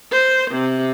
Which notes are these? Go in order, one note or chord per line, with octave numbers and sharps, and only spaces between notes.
C5
C3